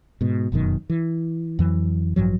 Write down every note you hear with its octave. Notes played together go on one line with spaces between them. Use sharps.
G#2 B2
F1 F#2 B2 D#3
E3
F2 E3 F#3
A1 G2 F3 F#3